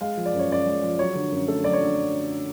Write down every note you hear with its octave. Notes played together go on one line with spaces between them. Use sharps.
G#3 F5
F3
D5
F#2
C#5
F#2 D5
G#3
F3
F#3 C#5
D3
F#2
A3 A4
F#3 D5
C#5
D3